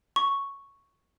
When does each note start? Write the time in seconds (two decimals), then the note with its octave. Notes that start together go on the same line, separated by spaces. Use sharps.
0.16 C#6